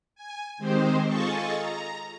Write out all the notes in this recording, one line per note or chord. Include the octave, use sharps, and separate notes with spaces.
G#5
D#3 G#3 C4 D#4 G4 C5
F4 G#4 A4 D#5 A5 C#6
A#5